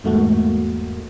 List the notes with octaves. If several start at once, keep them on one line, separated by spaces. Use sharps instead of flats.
E2 G#2 A3 A#3 F#4